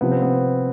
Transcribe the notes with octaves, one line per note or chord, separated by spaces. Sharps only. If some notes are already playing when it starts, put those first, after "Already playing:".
C3 F3 B3
C4
B3